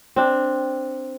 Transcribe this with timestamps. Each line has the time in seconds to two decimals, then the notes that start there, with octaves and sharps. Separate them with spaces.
0.16 C4 D4